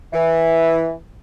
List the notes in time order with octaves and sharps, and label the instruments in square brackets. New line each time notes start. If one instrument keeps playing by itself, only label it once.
[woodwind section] E3